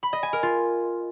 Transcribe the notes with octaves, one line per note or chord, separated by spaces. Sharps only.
B5
D#5
G#5
A#4
F4